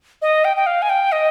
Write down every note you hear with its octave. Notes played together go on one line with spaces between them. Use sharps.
D#5
G5
G5
F5
G#5
G5
D#5